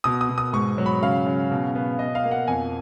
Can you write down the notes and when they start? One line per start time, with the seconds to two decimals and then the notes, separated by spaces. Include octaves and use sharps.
0.04 B2 D#6
0.21 D#6
0.29 B2
0.38 D#6
0.53 G#2 C#6
0.78 F#3
0.86 B5
1.02 C#3 F5
1.26 C#3
1.51 B2
1.75 B3
1.99 B2 D#5
2.15 F5
2.24 A#3
2.31 F#5
2.48 F2 G#5